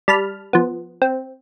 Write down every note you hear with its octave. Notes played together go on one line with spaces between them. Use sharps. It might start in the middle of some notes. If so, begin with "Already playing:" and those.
G3 A5 B5 F6
F3 B3
C4